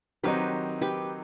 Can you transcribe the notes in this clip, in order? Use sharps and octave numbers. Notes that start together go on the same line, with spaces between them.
D#3 F#3 C4 D#4 G4 B4
G4 B4